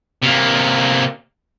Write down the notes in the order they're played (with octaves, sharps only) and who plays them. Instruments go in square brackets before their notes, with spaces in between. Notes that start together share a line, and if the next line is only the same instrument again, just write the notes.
[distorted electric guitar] C3 A#3